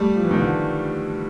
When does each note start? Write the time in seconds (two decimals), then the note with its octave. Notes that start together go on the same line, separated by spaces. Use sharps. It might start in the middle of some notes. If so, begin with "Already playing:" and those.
Already playing: G3 A3
0.16 F3
0.23 E3
0.31 D#3
0.39 D3 E3